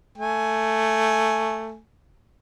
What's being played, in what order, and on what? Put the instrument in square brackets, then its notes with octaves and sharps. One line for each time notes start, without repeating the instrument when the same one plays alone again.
[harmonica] A3 G#5